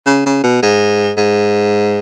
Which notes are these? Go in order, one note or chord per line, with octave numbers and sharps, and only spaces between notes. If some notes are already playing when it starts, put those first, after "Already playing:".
C#3
C#3
B2
G#2
G#2